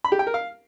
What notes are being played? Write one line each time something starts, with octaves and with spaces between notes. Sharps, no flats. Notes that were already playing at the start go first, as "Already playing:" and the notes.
B5
G4
G5
A#4
F5